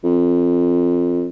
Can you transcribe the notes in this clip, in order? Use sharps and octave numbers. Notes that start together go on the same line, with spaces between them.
F2